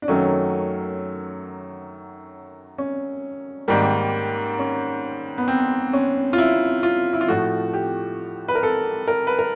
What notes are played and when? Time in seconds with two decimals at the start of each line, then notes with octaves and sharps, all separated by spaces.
0.02 D4
0.08 F#2 D#3 F#3 A3 C#4
2.78 C#4
3.68 G#2 D#3 G3 A#3
4.59 C#4
5.38 B3
5.48 C4
5.93 C#4
6.33 F4
6.38 E4
6.83 F4
7.13 E4
7.21 F4
7.28 A2 F3 A3 F#4
7.73 G4
8.48 B4
8.55 A#4
8.63 A4
9.07 A#4
9.27 B4
9.39 A#4